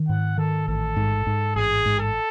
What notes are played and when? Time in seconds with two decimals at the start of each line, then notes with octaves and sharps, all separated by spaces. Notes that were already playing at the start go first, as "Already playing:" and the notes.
Already playing: D#3
0.09 G#2 F#5
0.38 D#3 A4
0.68 A1 A4
0.96 G#2
1.27 G#2
1.56 A1 G#4
1.86 G#2
2.00 A4